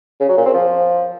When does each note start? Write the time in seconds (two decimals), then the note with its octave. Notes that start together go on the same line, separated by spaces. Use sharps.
0.20 C#3
0.29 F#3
0.37 A#2
0.46 C4
0.54 F3